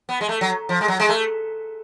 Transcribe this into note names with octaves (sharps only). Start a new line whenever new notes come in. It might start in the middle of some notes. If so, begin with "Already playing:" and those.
B3
G#3
A3
F#3
F3
G#3
F#3
G#3
A3